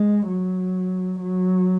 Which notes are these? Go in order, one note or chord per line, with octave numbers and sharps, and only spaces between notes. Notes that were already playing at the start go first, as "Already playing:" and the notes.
Already playing: G#3
F#3
F#3